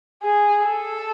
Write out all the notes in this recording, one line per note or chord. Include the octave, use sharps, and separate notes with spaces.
G#4
A4